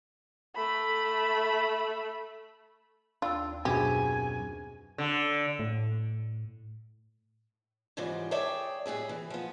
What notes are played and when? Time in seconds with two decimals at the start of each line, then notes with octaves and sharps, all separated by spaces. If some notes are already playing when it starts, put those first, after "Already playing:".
0.56 A3 B5
3.22 D#2 D4 F4 B5 E6
3.65 F#2 B2 C4 D4 G4 G#4 G#5 B5
4.98 D3
5.59 A2
7.97 G#2 C#3 E3 F3 G3
8.31 G#4 C#5 D5 E5 G5 A5
8.86 A2 G3 G#4 E5
9.09 E3
9.30 F3 B3